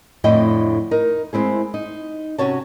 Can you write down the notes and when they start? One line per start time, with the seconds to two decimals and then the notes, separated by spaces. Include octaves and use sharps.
0.24 F2 A2 D3 E4 D#5 G5
0.91 D#4 A#4
1.33 G#3 C4 E4 G#4
1.74 D#4
2.38 C3 C#4 F#4 C#5 A5